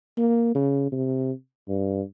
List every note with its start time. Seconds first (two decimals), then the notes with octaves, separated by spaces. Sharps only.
0.18 A#3
0.55 C#3
0.92 C3
1.68 G2